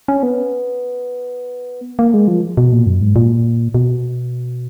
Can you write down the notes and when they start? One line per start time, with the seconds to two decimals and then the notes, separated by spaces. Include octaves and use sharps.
0.08 C#4
0.23 B3
1.99 A#3
2.14 G#3
2.28 F3
2.57 B2
2.72 A#2
2.86 F#2
3.01 G#2
3.16 A#2
3.75 B2